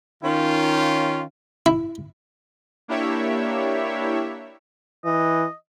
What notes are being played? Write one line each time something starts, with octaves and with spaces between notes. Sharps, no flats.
D#3 C#4 F4
E4
A#3 D4 E4 G4 C#5 E5
E3 D#5